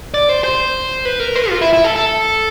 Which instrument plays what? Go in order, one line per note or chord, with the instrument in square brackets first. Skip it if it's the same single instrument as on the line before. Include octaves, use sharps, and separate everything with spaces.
[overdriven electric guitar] D5
C5
C5
B4
A#4
B4
F4
E4
E4
A4
A4